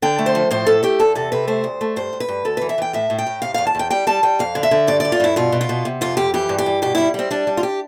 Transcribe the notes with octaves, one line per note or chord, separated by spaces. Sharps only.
D3 G5
A3
C5
F3
A2 C5
A2 A4
A3 G4
E2 A4
C3 A4
C3 B4
A3 C5
D2
A3
G2 C5
G2
B4
G2
D2 A4
E3 B4
E5
E3 G5
A2 E5
A2
G5
A2
C3 F5
E2 F5
A5
E2 G5
G3 G5
G3 A5
G3 G5
F2 F5
D3
E5
D3
G2 D5
G2 D5
F4
G2 E4
B2 F4
B2
F4
B2
C3
F2 F4
F2 G4
E3 G4
G2
G4
G2
B2 G4
G3 E4
G3 C4
G3 D4
G3
F4
G4